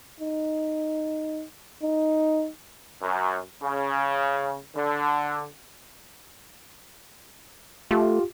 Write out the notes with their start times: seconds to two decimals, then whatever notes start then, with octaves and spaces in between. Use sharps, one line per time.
0.20 D#4
1.83 D#4
3.02 F#2
3.63 C#3
4.76 D3
7.91 A3 F4 G4